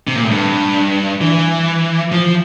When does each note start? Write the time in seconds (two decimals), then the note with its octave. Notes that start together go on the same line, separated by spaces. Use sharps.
0.07 C3
0.15 A#2
0.24 A2
0.31 G2
1.21 E3
2.12 F3